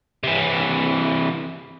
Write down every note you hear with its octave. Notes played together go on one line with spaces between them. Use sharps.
C3 E3